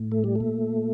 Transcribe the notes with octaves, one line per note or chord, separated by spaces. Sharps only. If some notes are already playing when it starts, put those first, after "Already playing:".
Already playing: A2
A3
G3
A3
A#2